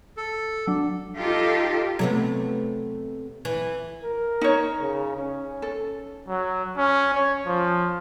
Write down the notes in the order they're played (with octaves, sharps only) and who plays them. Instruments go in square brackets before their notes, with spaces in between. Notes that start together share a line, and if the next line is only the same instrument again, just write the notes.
[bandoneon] A4
[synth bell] F#3 D4
[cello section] D#4 F4 G4 A4
[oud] C3 A3 B3 [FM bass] F#3
[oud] E3
[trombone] A#4
[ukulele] D#4 C#5
[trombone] C#3
C#4
[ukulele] A4
[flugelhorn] F#3
C#4
C#5
F3